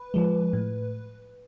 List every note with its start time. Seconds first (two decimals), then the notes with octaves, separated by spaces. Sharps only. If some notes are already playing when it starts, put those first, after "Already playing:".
Already playing: B4
0.14 F3 G#3
0.53 A2